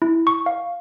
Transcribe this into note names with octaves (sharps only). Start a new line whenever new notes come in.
E4
C#6
F5